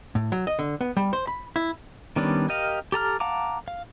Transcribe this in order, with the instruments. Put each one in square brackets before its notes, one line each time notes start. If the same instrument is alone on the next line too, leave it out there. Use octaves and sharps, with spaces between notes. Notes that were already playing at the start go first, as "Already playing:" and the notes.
[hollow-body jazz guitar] A2
F#3
D#5
D3
B3
G3
C5
B5
E4
[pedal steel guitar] D#3 G3 B3 C#4 D4
G4 A#4 D#5 F5
G4 A4 A#5 F6
F5 F#5 A5 A#5 D6
F5